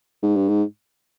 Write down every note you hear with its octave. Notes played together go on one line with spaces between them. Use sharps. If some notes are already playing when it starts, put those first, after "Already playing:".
G#2
G2
G#2